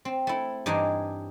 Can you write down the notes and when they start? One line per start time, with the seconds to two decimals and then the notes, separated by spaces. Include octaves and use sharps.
0.05 C4
0.27 A3 E4
0.66 G2 E3 D4 D#4 G#5